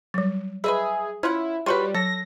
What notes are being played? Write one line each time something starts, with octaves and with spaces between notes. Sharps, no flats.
F#3 G3
G#4 B4 D#5 E5 B5
C#4 E4 F4 F#5
G3 F4 F#4 B4 C#5 C#6
F#3 A4 A#6